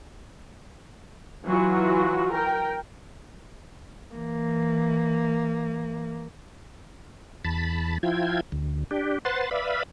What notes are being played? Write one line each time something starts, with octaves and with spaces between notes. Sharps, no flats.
E3 F#3 F4 F#4
A#4 G5
E3 A#3
E2 A5 B5
F3 E4 F4 G5 G#6
D2
D4 G4
B4 C5 F#5 C6 A6
B4 D5 E5 F5 B5